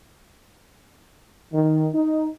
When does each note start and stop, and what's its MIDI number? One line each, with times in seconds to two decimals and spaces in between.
1.52 1.87 51
1.93 2.27 63